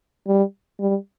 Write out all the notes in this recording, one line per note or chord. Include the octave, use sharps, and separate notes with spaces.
G3
G3